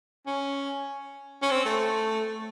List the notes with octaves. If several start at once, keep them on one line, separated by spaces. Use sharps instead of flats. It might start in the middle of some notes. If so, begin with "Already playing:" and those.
C#4
C#4
C4
A3